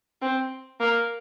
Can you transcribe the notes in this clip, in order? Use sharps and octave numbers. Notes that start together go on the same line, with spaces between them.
C4
A#3